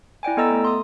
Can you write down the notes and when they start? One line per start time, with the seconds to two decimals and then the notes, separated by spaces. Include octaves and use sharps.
0.23 E4 D5 G5 G#5
0.37 B3 A4 D#5 A#5 E6 A6
0.51 A3
0.65 C6 D#6